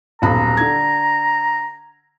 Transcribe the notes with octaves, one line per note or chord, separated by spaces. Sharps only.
D#1 B1 A#5 B5
D3 G#6